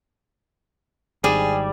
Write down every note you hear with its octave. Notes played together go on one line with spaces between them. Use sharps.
G#1 G#2 G3 G#4